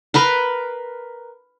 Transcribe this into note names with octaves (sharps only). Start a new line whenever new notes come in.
A#4 B4 A#5 C6